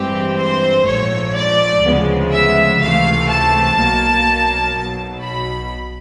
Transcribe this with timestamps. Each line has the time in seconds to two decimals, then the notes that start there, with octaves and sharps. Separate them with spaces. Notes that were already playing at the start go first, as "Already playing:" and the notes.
Already playing: G2 E3 G#3 C4 G4
0.36 C5
0.84 A#1 G#2 F3 A3 C#5
1.34 D5
1.81 D2 C#3 F3 G#3 B3
2.30 E5
2.79 C#2 C3 E3 A3 F5
3.29 A5
3.77 B1 B2 F#3 A#3
4.75 B1 B2 F#3
5.23 B5